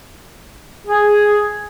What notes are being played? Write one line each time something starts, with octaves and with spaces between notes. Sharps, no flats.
G#4